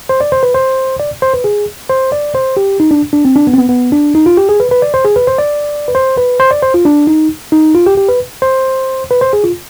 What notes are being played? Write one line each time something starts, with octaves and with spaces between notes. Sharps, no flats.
C5
D5
C5
B4
C5
D5
C5
B4
G#4
C5
D5
C5
G4
D#4
D4
D4
C4
D4
B3
C4
B3
B3
D4
D#4
F4
G4
G#4
B4
B4
D5
C5
G#4
B4
C5
D5
B4
C5
B4
C5
D5
C5
F4
D4
D#4
D#4
F4
G4
G4
B4
C5
B4
C5
G#4
F4